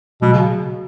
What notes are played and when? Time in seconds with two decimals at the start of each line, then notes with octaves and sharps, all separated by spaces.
0.22 B2 F#3
0.34 C#3